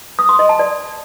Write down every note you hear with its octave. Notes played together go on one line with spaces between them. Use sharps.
D#6
C6
D#5
A5
D5